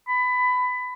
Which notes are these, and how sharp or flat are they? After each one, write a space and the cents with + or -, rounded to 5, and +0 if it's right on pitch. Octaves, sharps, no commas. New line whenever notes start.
B5 +20